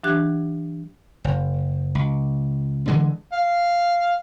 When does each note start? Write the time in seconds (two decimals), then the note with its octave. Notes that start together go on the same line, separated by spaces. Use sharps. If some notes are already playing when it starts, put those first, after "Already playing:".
0.04 E3 F#3 D4 G4 F#6 G#6
1.24 F#1
1.95 C#2
2.88 D3 E3 G#3
3.33 F5